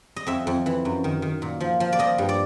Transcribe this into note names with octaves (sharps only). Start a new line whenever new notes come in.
D#5
F2 E5
F2
E3
F#2
D#3
D#3
A#2
F3
F3
D5
F3 D#5
G2
D5